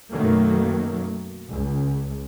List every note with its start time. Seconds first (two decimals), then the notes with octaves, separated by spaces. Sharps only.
0.11 F#2 B2 D#3 F#3 A3 A#3
1.49 C#2